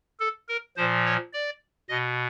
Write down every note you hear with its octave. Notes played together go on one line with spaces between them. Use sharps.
A4
A#4
A#2 F3 C5
C#5
D5
B2 D#5